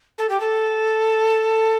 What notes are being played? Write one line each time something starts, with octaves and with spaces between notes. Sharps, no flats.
A4
G4
A4